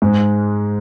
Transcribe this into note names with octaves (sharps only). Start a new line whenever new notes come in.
G#2 G#3